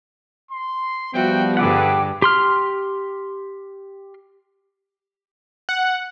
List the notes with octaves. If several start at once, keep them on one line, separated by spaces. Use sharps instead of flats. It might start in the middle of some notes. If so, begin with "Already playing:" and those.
C6
F3 G3 B3 F#4 E5 G5
G2 D3 G4 G#4 B4 D5 F#5
G4 C6 F6
F#5